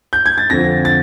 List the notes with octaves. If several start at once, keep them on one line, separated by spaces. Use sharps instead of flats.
G6
G#6
A6
F2 D3 F3 A#6
A6